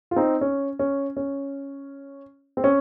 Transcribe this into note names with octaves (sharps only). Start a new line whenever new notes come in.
F4
C4 D#4
C#4
C#4
C#4
C4
C#4